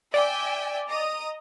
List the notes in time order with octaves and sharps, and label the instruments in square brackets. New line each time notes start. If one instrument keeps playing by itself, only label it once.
[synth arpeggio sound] D5 [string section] E5 G5 G#5
[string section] D#5 A#5 D#6